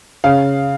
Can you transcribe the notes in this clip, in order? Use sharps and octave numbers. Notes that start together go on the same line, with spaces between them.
C#3 F5